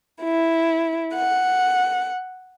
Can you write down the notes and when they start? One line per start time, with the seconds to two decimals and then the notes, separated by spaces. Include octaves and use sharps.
0.23 E4
1.16 F#5